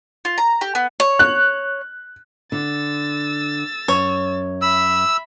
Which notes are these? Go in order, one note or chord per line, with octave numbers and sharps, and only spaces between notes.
F4
A#5
G4
B3
C#5
F#6
D3 E6 A6
F#2 C#5
E5 B5 E6